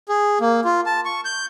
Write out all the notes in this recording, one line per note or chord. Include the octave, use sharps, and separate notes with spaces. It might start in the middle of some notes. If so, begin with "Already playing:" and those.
G#4
A#3
F4
A5
C#6
G6